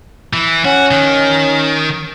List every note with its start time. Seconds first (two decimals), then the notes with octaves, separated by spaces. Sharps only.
0.33 E3
0.65 C#4 F#4
0.91 D#3